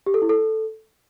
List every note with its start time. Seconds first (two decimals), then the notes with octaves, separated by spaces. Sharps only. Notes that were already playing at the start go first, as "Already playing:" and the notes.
0.06 G4
0.14 A4
0.22 E4
0.29 A4